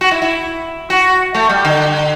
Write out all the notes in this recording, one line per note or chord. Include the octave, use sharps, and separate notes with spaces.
F#4
E4
E4
F#4
A3
G3
D3